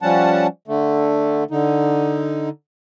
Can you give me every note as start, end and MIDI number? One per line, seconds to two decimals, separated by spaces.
0.02 0.47 53
0.02 0.47 55
0.02 0.47 61
0.02 0.47 78
0.02 0.47 81
0.68 1.44 50
0.68 1.44 57
1.51 2.49 50
1.51 2.49 63